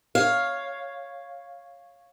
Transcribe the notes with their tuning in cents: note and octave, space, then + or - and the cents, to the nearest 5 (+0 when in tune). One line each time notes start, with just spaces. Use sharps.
C#5 +0 F5 +0